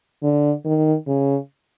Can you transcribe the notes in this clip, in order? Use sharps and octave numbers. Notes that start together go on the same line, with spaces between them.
D3
D#3
C#3